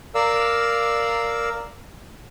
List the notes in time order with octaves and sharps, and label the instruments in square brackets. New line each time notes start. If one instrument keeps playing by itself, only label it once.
[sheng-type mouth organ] A#4 D5 F5 E6